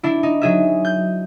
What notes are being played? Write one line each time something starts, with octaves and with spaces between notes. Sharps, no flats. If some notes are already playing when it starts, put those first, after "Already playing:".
D4 E4
D#4
F#3 G#4 E5
G6